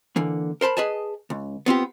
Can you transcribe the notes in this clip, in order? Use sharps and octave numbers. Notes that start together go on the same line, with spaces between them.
D3 E3 A#3
A#4 C5 A5 B5
G#4 B4 D#5 G#5 A5
C#2
B3 C4 F4 G4